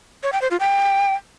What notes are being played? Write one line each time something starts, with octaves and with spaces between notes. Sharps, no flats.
C#5
G5
C5
F4
G5